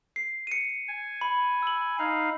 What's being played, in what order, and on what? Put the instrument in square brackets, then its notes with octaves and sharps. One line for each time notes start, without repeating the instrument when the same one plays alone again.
[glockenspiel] C7
C#7 D#7
[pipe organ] G#5
[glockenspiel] B5
E6 F#7
[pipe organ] D#4 F5